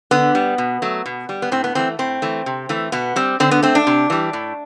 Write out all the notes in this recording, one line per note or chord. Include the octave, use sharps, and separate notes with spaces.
D3 B3
G3
B2
F#3 A3
B2
G3
B3
A2 C4
B3
E3 A3 C4
A2 C4
E3 A3
C3
E3 A3
B2 B3
G3 C4
D3 C4
B3
A3 C4
D4
C3
E3 G3
A2